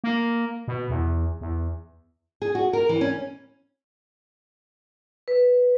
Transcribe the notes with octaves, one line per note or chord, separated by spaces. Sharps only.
A#3
B2
E2
E2
G#4
F#4
A#4
E3
C#4
B4